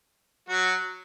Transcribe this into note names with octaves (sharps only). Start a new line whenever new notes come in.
F#3 F#4